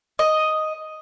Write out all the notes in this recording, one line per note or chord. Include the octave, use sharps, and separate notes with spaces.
D#5